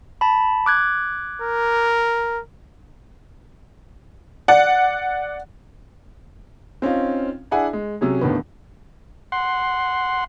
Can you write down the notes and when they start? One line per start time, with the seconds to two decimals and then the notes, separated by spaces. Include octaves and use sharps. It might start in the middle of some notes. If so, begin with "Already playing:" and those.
0.21 A5 B5
0.66 D6 F#6 G#6
1.41 A#4
4.48 D5 F#5
6.82 C4 C#4 D#4 F4
7.51 D4 E4 G#4 F#5 G#5
7.73 G#3
8.01 C3 F#3 C#4 G#4
8.21 D#2 A2 D3 D#3 B3
9.32 F#5 C6